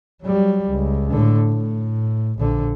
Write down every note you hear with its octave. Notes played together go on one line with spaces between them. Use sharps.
F#3 G3
C#2
A2 D3
A2
A#1 D3